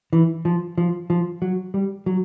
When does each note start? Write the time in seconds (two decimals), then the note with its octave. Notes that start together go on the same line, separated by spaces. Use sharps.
0.13 E3
0.45 F3
0.78 F3
1.10 F3
1.42 F#3
1.74 G3
2.06 F#3